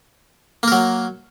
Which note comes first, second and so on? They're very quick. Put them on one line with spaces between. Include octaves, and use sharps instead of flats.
A#3 A#4 F#3